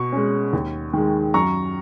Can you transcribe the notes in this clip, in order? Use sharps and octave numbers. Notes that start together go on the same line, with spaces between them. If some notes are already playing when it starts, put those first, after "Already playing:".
Already playing: B2 C#6
G#3 C#4
D#2
D#3 G#3
F#2 A#5 C#6